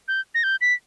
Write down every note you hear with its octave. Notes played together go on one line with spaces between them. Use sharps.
G6
A#6
G6
B6